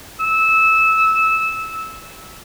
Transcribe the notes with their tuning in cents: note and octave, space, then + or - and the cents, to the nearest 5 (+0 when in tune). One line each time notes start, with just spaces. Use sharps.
E6 -15